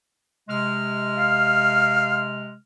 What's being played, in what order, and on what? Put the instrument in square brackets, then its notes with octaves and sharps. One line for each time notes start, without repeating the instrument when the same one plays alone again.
[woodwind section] C3 G#3 F6
[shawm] F5